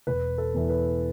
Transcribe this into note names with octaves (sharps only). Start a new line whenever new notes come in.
E1 B4
A4
E2 E3
B4